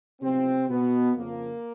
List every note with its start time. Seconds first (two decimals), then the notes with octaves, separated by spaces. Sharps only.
0.21 B1 A2 C3 F3 C4
0.69 B2 B3
1.16 F2 C#3 F3 A#3